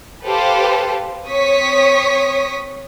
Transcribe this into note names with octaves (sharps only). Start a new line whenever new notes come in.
G4 A4 B4 C5 F5
C4 C#5 C#6 D#6 B6